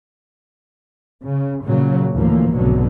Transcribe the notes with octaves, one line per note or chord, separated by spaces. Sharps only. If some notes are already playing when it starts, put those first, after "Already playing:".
C#3
A#2 C#3 F#3
D2 A2 E3 F3 A#3
F1 B1 G#2 B2 D3 F#3